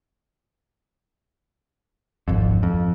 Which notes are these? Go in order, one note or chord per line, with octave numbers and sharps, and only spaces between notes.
D1 G#1 F2
F2